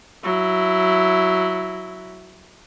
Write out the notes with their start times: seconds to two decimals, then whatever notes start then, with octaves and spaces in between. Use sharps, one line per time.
0.24 F#3 E4